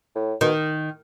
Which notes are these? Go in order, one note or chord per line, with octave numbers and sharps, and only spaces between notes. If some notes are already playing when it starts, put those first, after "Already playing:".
A2
B2 D#3